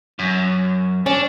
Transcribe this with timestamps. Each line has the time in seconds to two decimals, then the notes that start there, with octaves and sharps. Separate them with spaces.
0.19 F#2
1.06 C#4 D4